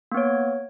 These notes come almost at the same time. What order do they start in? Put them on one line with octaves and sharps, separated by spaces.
A#3 B3 C#5